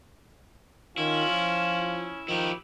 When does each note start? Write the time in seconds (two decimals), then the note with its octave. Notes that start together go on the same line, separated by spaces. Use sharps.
0.98 D#3 C#4 E4 F4
1.31 F3
2.28 D#3 F3 E4 G4